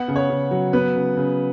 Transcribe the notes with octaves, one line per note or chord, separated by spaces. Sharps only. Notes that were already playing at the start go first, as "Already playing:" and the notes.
Already playing: B3 F#5
C#3
C#5
C#3
F#3
B3 B4
C#3
C#3